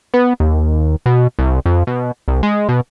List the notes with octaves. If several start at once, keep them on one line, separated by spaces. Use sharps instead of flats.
B3
D#2
B2
C2
F2
B2
C2
G#3
B2